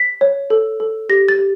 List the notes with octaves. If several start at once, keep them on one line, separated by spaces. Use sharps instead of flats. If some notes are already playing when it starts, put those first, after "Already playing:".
Already playing: B6
C#5
A4
A4
G4 A#6
A6
G4